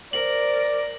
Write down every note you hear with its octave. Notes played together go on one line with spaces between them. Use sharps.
A#4 C5 D5 F#7